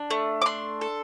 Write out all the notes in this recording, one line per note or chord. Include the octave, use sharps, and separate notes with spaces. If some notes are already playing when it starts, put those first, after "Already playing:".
Already playing: D4
A3
D6
D4 C6
A4